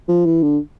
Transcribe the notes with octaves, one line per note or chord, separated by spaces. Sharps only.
F3
E3
D3